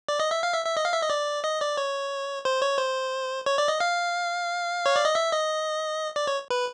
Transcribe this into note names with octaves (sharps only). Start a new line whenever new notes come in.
D5
D#5
E5
F5
E5
E5
D#5
F5
E5
D#5
D5
D#5
D5
C#5
C5
C#5
C5
C#5
D5
D#5
F5
C#5
D5
D#5
E5
D#5
D5
C#5
B4